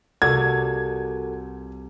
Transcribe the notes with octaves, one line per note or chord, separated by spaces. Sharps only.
C2 F4 F#4 A4 A#4 D5 F#5 G#6